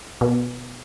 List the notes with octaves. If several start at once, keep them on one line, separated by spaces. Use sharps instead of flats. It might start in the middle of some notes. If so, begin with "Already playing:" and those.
B2